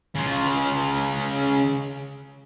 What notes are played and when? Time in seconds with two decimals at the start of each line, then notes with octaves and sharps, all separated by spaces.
0.15 C#3 F4